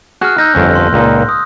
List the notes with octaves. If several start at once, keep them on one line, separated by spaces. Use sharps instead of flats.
F#4 G#4 F6 F#6
D#4 E6 G6 A#6
G1 F2 C#4
C6
C#2 A#2 D#4
D#6